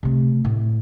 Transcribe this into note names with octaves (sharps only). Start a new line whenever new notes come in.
C3 A3
A2